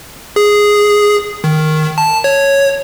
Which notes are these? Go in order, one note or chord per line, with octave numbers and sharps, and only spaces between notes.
G#4
D#3
A5
C#5